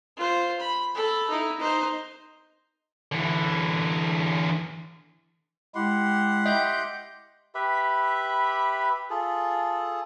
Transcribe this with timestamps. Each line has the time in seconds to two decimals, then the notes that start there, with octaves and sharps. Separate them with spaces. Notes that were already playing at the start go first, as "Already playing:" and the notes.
0.17 F4 C5
0.60 B5
0.95 A4 B5
1.29 D#4 E4
1.59 D#4 C5
3.12 D3 E3
5.75 G#3 E4 G4 F#5 C6
6.46 D#5 E5 G5 G6
7.55 G4 B4 E5 B5
9.10 F4 G#4 A4